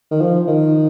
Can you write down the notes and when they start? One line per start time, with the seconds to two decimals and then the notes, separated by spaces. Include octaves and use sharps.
0.11 D#3
0.20 F3
0.47 D#3